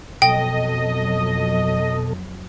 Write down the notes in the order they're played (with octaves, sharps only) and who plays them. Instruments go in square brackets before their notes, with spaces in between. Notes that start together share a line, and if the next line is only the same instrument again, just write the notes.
[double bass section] F2 F#3 [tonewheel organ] B2 A4 [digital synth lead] D#5 [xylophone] G5